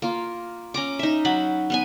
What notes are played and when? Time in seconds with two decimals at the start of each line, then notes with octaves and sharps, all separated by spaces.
0.02 A#3 F4
0.74 C#4 A#5 D6
0.99 D#4 E5
1.25 F#3 F#4 B5
1.70 B3 B4 G#5